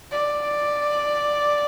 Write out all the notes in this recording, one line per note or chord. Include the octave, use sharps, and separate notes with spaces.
D5